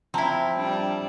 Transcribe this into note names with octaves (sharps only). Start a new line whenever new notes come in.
F3 C4 E4 A5 A#5
G3 D4